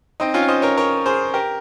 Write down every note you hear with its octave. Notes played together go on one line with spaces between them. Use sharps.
C4 D#4
C#4 F4
F5
C5 D#5
A#4 C#5
A#4 C#5
G#4 C5
G4 A#4